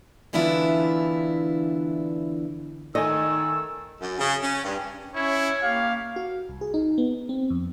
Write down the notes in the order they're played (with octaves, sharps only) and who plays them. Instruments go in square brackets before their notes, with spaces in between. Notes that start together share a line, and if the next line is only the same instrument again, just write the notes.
[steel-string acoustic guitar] D3 E3 B3 D4 E4 F4
[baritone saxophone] D#3 [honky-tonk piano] A3 G#5 [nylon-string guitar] D#5 [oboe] E6
[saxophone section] F#2
C#3
C#4
G2
[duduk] C#4 [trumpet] E4 [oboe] C#5
[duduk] A#3 [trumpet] G4 [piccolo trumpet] F5
[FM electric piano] F#4
C2
G#4
D#4
B3
C4
F2